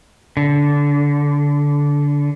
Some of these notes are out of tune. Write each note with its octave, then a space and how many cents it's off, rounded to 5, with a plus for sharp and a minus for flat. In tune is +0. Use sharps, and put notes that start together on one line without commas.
D3 -20